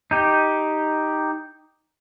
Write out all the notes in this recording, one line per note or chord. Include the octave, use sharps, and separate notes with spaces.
D#4 G4